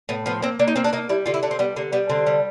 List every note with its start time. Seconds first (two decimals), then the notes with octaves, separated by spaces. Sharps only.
0.09 A2 B3
0.26 F3 B3
0.42 A#3 C4
0.59 A#3 D4
0.68 D#4
0.76 A#3 C4
0.84 D4
0.93 A#3 D#4
1.09 G3 E4
1.26 D3 F4
1.34 E4
1.43 D3 D4
1.51 C4
1.59 G3 B3
1.76 D3 A#3
1.93 G3 B3
2.10 D3 C4
2.27 G3